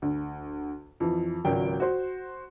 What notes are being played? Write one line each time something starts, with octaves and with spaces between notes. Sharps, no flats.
D2
F2 E3
G#1 C#2 F#3 A#4 G5
F#4 C5